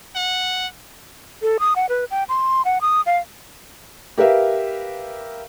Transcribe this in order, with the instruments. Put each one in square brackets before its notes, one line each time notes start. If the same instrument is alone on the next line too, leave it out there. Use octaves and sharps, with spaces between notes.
[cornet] F#5
[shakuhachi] A4
D#6
F#5
B4
G5
C6
F#5
D#6
F5
[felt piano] G4 A#4 B4 E5 F5